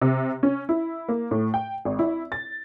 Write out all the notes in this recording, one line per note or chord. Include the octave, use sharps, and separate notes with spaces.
C3
C#4
E4
A#3
A2
G5
G#1
E4
A6